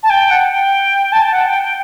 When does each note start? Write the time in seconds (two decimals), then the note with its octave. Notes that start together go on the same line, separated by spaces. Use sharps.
0.03 A5
0.10 G5
0.30 F#5
0.50 G5
1.12 A5
1.22 G5
1.31 F#5
1.46 G5
1.62 G5